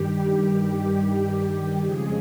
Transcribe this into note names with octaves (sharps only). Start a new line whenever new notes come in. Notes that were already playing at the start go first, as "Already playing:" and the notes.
Already playing: G2 D#3 G3 G4
G4
F2 C#3 F3 G#3 G#4